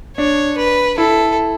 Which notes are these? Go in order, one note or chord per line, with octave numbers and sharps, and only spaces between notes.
D4 C#5
B4
E4 A4